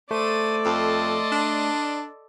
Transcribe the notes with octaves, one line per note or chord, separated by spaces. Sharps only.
A3 A4 C5 D5 D#7
F2 D#5 C6
D4